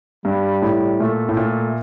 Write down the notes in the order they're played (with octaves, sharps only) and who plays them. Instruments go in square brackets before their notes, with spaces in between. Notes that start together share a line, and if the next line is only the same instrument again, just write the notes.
[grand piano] G2 [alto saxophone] G3
[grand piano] A2
[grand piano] A#2 [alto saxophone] A3
[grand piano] A2
A#2